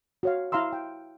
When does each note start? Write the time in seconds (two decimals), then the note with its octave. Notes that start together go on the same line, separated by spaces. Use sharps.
0.23 F#4 C#5 F5
0.52 E4 F5 A#5 C6 E6
0.73 G5